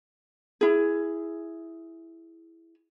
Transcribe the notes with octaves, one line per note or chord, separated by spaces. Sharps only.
E4 G#4